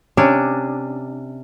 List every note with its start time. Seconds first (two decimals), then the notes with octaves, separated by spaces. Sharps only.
0.17 C3 C#4 D4